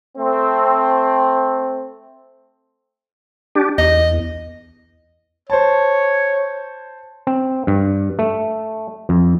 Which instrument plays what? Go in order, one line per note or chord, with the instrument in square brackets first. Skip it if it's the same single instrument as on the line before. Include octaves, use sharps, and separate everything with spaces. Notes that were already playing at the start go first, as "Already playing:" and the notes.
[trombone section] A3 C4
[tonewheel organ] D4 G4
[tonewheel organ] E2 [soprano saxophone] D#5
[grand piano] C5 A5 [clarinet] C#5
[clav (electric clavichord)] C4
G2
A3
F2